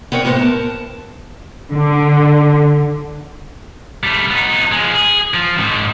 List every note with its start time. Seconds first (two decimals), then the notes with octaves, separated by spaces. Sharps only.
0.12 B3 C4 A#4 C#5
0.25 A2 C3 B3 C5
0.39 A#4 A5
1.71 D3
4.04 G3 A3
4.30 B3 D#4
4.72 F3 G#3
4.93 G#4
5.34 F3
5.59 G#2 D#3